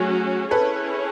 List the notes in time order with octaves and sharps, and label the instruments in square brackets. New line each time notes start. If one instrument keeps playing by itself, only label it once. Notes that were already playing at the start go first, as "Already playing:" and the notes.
Already playing: [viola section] F#3 A3 C#4 F#4 [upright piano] G#4
[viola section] C#4 E4 G#4 C#5 [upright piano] A4 B4